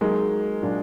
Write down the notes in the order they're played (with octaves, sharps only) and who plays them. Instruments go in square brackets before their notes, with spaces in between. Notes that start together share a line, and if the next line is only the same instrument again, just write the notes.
[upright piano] F#3 A#3 D#4 A#4 [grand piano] G#3
[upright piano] A#2 F#3 D4 F4